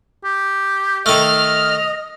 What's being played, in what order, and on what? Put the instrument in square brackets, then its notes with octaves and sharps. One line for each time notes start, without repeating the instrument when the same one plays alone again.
[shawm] G4
[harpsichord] D#3 A3 [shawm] D#5 [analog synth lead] F6